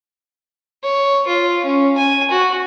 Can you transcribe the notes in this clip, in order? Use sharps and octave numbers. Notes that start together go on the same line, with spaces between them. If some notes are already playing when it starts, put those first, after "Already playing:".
C#5
F4
C#4
G#5
F#4